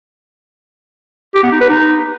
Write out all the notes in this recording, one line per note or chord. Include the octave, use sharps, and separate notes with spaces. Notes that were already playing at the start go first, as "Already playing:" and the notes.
G4
B3
D#4
B4
D#4